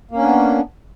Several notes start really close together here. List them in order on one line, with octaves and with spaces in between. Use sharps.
A#3 C#4 D4 B3